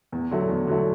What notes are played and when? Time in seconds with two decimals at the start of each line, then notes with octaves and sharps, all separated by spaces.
0.12 E2
0.31 D3 F#3 A3
0.49 E2
0.67 D3 F#3 A3